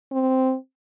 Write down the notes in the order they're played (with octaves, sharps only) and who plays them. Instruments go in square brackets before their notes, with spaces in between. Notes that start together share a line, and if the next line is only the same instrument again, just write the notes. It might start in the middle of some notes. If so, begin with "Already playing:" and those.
[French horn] C4